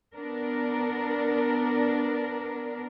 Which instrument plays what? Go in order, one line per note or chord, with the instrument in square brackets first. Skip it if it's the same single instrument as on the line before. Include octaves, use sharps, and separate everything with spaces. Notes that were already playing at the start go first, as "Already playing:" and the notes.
[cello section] B3 D4 A#4